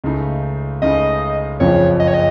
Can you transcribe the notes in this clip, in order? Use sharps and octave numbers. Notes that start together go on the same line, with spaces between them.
C#2 C#3 A3 D#4
C#2 C#3 A3 D#4 D#5
F#1 F2 C#3 F3 C#5
D#5
C#5
D#5